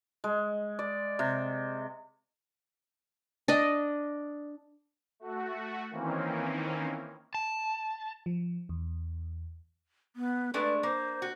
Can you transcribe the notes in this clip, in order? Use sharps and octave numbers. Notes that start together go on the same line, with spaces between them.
G#3
D5
C3
D4 D5 D#5
A3 F#4
D#3 E3 A#3 C4 C#4
A5
F3
E2
B3
G#3 A3 D4 B4
A#3 C5
F#4